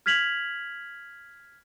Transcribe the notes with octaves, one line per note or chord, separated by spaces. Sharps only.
F6 G#6 B6 F7 F#7